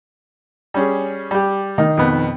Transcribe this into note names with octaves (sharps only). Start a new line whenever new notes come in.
G3 C#4 G#4
G3 G4
D#3 D#4
F2 B2 B3